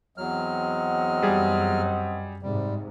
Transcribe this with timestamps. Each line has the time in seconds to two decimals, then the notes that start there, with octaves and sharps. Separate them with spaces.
0.18 E2 F#3 C4 D#5 F#5 F6
1.22 F#2 G3 G#4
2.42 G#2 C3 G3